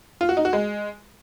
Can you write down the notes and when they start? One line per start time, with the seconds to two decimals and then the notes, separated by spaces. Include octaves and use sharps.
0.21 F4
0.29 F#4
0.37 D#4
0.45 F#4
0.53 G#3